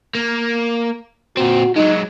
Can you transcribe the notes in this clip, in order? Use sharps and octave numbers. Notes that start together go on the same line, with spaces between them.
A#3
A#2 C4 F#4
F#3 G#3 D#4